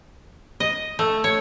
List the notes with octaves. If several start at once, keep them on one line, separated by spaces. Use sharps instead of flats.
D#5
A3
C#5